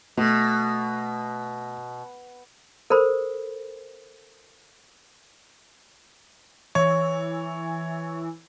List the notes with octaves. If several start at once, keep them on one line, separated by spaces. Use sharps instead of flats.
B2 A3
A4 A#4 C5 B5
E3 C#5